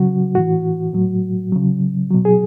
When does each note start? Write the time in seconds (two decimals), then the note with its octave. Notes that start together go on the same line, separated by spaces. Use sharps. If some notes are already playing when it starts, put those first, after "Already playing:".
Already playing: C#3 F#3 F#4
0.35 A2 E3 F#4
0.93 A2 F#3
1.52 C#3 F#3
2.11 B2 F#3
2.25 G#4